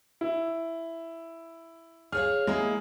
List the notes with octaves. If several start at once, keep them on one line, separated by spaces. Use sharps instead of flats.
E4
G#4 C#5 F5 F6
G#3 A#3 E4